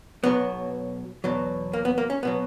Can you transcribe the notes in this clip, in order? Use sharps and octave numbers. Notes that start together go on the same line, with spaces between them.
B1 B2 F#3 B3
E2 B2 F#3
A#3
B3
A#3
C#4
B2 F#3 B3